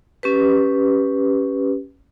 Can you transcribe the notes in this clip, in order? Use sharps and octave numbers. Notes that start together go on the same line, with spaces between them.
C#4 G4 B4